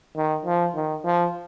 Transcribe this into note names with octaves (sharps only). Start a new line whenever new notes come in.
D#3
F3
D#3
F3